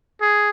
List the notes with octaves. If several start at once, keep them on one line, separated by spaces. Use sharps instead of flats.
G#4